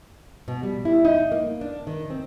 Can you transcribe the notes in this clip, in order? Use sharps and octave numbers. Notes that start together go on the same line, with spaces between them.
B2
G3
E4
D#4
A#3
D4
D#3
C4